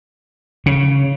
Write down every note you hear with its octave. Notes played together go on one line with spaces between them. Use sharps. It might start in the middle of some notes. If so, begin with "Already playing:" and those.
C#3